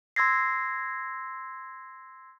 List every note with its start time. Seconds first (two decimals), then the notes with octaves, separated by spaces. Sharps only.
0.16 C6 E6 G#6 A#6 C7